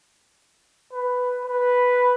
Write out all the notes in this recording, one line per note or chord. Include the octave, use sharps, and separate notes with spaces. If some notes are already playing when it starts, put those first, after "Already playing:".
B4
B4